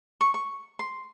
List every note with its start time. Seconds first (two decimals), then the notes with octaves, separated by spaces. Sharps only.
0.21 C#6
0.34 C#6
0.79 C6